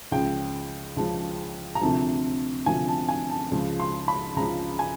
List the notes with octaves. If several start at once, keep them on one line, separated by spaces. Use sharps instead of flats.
C#2 C#3 F3 G5
C#2 C#3 F3 A5
A#5
D2 C3 F3 A5
D2 C3 F3 G#5
A5
G#5
A5
C#2 C#3 F3
C6
B5
C#2 C#3 F3 A#5
G#5